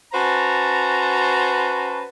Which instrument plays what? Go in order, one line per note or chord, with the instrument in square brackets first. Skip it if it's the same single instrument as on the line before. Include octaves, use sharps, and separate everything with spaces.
[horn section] C#4 F#4 B4 C5 A5 A#5